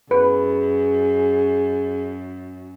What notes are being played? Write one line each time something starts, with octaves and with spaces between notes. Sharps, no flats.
F#2 G#4 B4